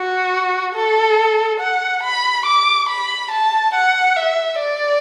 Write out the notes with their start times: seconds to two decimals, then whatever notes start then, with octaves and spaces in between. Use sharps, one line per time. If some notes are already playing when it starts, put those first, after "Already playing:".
Already playing: F#4
0.75 A4
1.60 F#5
2.03 B5
2.46 D6
2.88 B5
3.31 A5
3.74 F#5
4.16 E5
4.59 D5